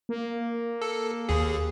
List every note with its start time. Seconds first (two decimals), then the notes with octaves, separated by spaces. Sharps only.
0.09 A#3
0.82 A4
1.29 D#2 G#4